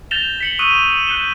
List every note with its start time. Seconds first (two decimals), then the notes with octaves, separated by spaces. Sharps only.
0.11 G6 A6 A#6 E7 F7 G7
0.41 B6 C#7 F#7
0.59 C#6 D#6 E6 F#6 B6 D#7
1.06 F#6 G6 C#7 E7 G7